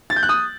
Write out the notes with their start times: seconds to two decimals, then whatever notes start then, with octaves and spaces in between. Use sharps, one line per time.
0.10 A6
0.16 G6
0.23 F#6
0.29 D#6